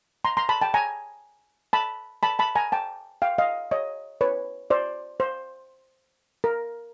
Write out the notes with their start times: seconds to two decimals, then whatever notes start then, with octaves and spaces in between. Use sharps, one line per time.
0.25 A#5 C6
0.37 A#5 C6
0.49 A5 B5
0.61 G5 A5
0.74 G#5 A#5
1.73 A5 B5
2.23 A5 B5
2.39 A5 B5
2.55 G#5 A#5
2.72 G5 A5
3.22 F5 G5
3.38 D#5 F5
3.71 C#5 D#5
4.21 B4 C#5
4.70 C5 D5
5.20 C5
6.44 A#4